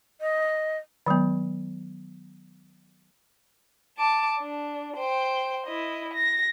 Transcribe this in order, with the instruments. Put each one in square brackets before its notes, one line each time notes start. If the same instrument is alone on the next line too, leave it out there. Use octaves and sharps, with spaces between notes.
[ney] D#5
[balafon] D#3 F#3 G#3 B3
[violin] A5 D6
D4
C5 G5
E4 D#5
A#6